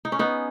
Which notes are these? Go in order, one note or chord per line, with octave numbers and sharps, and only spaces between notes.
D#4
C#4
B3 D#4